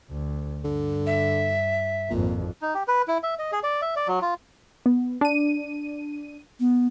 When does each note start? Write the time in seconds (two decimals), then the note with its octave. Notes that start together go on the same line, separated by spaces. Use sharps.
0.11 D2
0.64 G2 D3
1.07 E5
2.10 G#1 F2 A#2
2.62 D#4
2.74 G4
2.88 B4
3.08 E4
3.23 E5
3.39 D#5
3.52 G#4
3.63 D5
3.82 E5
3.96 D5
4.08 F#3
4.22 F4
4.86 B3
5.21 D4 D#7
6.60 B3